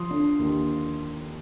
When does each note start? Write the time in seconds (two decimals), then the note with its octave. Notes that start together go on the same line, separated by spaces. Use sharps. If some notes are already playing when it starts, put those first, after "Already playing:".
Already playing: F3 C6 D#6
0.11 D3
0.39 D#2